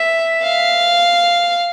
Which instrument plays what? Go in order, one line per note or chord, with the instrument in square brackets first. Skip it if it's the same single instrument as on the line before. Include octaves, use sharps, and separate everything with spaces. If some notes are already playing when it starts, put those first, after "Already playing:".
Already playing: [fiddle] E5
F5